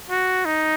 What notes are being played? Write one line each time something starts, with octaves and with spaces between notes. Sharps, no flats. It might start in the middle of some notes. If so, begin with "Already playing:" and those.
F#4
D#4